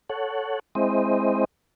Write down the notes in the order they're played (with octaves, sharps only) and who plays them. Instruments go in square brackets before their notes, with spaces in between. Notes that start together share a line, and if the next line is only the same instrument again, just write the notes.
[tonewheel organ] A4 C#5 F#5
G#3 C4 E4 C5 D#5